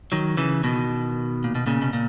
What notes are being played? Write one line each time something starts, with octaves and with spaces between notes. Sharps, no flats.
D#3 F#3
C#3 E3
B2 D#3
A#2
B2
A#2 C#3
B2
A#2